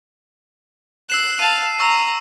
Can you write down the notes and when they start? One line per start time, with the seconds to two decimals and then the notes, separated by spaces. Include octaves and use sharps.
1.10 E6 F#6 C7 E7
1.39 F5 A5 D#7
1.80 A#5 C#6 E6